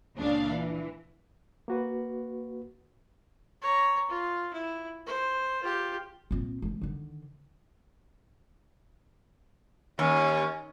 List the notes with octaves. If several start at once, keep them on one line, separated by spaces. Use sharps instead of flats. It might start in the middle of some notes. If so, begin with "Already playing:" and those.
C#2 A#2 C#3 D4 F5
E3
A#3 F#4 B4
C#5 A#5
F4
E4
C5
F4 G4
A#2 C4
E3 G#3
D3 D#3
D#2 C#4